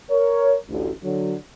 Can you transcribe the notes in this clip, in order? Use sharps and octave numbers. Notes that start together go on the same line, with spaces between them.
A#4 C#5
A1 D2
D3 F#3